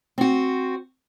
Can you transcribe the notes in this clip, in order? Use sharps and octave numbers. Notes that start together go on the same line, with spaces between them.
C4 F#4